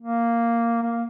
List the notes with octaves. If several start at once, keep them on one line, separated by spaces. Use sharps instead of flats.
A#3
A#3